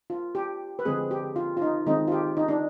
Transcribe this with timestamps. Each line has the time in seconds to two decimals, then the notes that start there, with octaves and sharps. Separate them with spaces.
0.10 F4
0.35 G4
0.79 B4
0.85 D3 F3 G#3 C4 G#4
1.11 G4
1.36 F4
1.57 F4
1.62 D#4
1.86 D#3 G#3 C4 D#4
2.08 F4
2.12 G4
2.37 D#4
2.48 D4